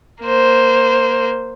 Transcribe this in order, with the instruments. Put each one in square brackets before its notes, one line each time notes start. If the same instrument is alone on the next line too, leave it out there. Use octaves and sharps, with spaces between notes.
[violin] A#3 C5